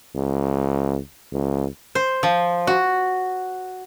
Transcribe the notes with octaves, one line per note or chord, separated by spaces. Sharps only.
C#2
C#2
C5
F3
F#4